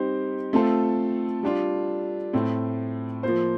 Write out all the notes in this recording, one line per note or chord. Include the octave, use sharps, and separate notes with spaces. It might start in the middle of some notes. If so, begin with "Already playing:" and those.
Already playing: G3 C4 D#4 G4 C5
A3 C4 F4 A4
G3 D4 F4
A2 A3 C4
F3 A#3 F4 C5